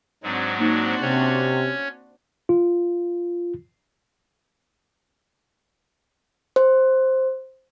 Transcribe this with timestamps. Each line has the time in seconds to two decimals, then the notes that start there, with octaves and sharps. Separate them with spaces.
0.23 G#2 F#3 G#3 C4 D4 F#4
0.59 A#3 D#4
1.02 C3 C#4 C#5
2.49 F4
6.56 C5